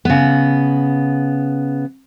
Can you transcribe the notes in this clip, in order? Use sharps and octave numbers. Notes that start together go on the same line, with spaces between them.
C#3 B3